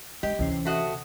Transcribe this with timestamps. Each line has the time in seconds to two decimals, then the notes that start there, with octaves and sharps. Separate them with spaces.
0.23 G#3 G4 D#5
0.39 D2 C3 E3 C#4 D4 C7
0.65 A3 F#4 D#5